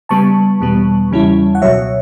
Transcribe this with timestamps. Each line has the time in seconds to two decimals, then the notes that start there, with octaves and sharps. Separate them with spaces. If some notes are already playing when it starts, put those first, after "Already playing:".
0.09 C#3 G3 B3 A5 C#6
0.61 E2 B2 G3 B3
1.11 E2 C#3 G3 C#4 E4
1.55 F#5
1.62 C#2 B2 F#3 C#5 E5